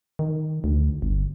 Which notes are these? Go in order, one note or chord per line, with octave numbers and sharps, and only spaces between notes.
D#3
D2
G1